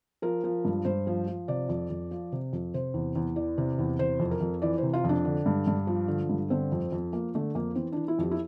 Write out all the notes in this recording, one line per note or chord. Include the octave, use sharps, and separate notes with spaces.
F3 A#4
F3
G2
G2 C5
F3
F3
C3 D5
F2
F2
F3
C3
F2
C3 C5
E2
E2
E3 D5
C3
E2
C3 C5
F2
A#4
F2
E3 D5
C3 C5
F4
F2 D4
D3
G2
G2
F3
D3
G2
D3 C4
F2
F2
F3 A#3
D3 A3
F2 A#3
E3 C4
E3 D4
E4
F2 G4
E4